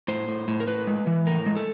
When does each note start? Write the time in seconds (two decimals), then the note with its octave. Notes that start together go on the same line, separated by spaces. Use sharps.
0.08 A2 C5
0.28 A2
0.48 A2
0.60 A#4
0.67 A2 B4
0.87 G#3
1.07 E3
1.27 A2 A#4
1.46 G#3
1.56 A4